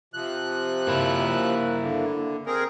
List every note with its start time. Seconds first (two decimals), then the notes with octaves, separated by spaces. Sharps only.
0.14 C3 F3 F#6
0.88 A#3 E4
1.82 D3
2.47 C4 G#4 A#4